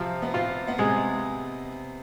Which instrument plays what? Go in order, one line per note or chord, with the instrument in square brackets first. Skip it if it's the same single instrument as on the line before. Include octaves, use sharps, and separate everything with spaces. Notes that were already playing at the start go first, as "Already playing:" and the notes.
Already playing: [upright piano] C3 C4 [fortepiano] F3
[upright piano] B3
[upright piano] C3 C4 [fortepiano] F4
[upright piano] B3
[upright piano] C3 C4 [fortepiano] G#3